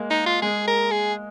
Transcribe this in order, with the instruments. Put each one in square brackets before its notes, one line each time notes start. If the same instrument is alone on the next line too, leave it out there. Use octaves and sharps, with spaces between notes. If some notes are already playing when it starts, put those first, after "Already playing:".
Already playing: [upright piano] G#3 A#3
[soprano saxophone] D#4
F4
[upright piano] G#3 [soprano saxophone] G#4
[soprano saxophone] A#4
G#4